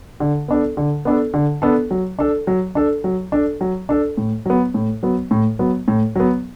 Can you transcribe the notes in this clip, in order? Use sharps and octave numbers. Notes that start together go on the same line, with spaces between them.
D3
B3 D4 A4
D3
B3 D4 A4
D3
B3 D4 A4
F#3
D4 A4
F#3
D4 A4
F#3
D4 A4
F#3
D4 A4
A2
F#3 B3
A2
F#3 B3
A2
F#3 B3
A2
F#3 B3